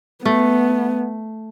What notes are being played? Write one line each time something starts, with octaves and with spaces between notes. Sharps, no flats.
A3 B3